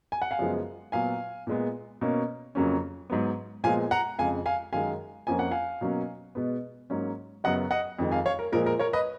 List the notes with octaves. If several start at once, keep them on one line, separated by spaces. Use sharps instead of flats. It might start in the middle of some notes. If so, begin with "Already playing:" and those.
G#5
F#5
F5 G#5
F#2 C#3 F3 G#3 B3
A#2 F#3 B3 F5 G#5
A#2 G#3 B3
B2 A#3 C#4
F2 C#3 F#3 A#3 C#4
G#2 F#3 B3
A#2 F3 G#3 B3 F5 G#5
F#5 A#5
F2 C#3 G#3 F5 G#5
F5 G#5
F#2 D#3 G#3 F5 G#5
F2 F3 A#3 C#4 G#5
F#5
F5 G#5
B2 F#3 A#3 C#4
B2 G#3 B3
G#2 F#3 A#3 C#4
F#2 C#3 F#3 B3 D#5 F#5
D#5 F#5
F2 D#3 G#3
F5 G#5
C#5 F5
A#4
A#2 F3 G#3 A#4
A#4
A#4 C#5
B4 D#5